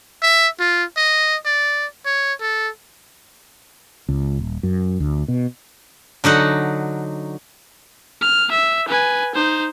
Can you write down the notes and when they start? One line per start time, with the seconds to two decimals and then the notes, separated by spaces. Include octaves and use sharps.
0.22 E5
0.60 F4
0.97 D#5
1.45 D5
2.05 C#5
2.40 A4
4.09 C#2
4.39 D#1
4.63 F#2
5.00 D2
5.28 B2
6.24 D3 F#3 D#4 F#5
8.21 F6
8.51 E5
8.88 B4 G#5
9.35 D#4 C5